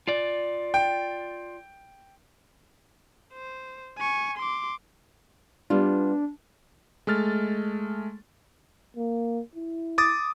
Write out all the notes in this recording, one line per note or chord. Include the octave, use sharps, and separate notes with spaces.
F4 D5
G5
C5
G#5 C#6
C6 D6
G3 B3 D4 F4
G#3 A3 F6 A6
A#3
E4
D6 D#6 A6